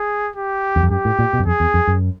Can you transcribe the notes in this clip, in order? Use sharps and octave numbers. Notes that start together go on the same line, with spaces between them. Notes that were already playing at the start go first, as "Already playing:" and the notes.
Already playing: G#4
G4
E2
F2
F#2 G4
A2
A#2
B2
F#2
F2 G#4
E2
F2
F#2